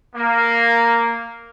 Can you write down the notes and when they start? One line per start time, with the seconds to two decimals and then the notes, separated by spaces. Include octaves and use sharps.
0.16 A#3